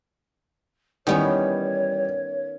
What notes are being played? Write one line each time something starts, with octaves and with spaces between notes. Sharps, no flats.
D#3 E3 G3 B3 C#4 C#5